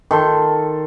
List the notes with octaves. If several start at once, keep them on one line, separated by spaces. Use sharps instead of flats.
D#3 A4 C6